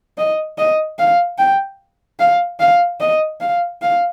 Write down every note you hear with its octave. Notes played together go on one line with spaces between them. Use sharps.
D#5
D#5
F5
G5
F5
F5
D#5
F5
F5